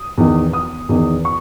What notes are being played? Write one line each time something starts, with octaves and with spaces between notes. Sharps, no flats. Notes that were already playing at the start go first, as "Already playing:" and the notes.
Already playing: D#6
E2 D#3
D#6
E2 D#3
C#6